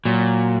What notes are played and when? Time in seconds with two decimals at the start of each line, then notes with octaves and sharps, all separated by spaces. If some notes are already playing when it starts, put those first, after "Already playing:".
0.05 A#2 F#3